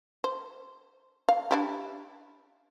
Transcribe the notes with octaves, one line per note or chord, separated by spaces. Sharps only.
C5
F5
D4 E4 G4